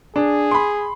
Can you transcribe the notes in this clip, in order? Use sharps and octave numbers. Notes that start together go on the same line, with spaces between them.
D4 G#4
B5 C6